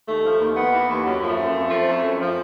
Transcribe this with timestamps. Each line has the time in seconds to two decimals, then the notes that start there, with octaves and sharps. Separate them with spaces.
0.06 D#2 A3
0.24 F3
0.39 D#2
0.56 D#2 B3
0.72 E3
0.89 D#2
1.05 F#2
1.22 F3
1.29 A3
1.37 F#2
1.54 F2
1.70 F3
1.87 F2
2.03 F#2
2.20 F3